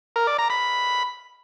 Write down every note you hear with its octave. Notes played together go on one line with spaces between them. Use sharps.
A#4
D5
A#5
B5